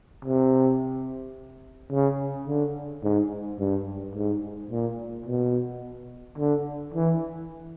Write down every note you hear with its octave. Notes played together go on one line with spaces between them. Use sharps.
C3
C#3
D3
G#2
G2
G#2
A#2
B2
D3
E3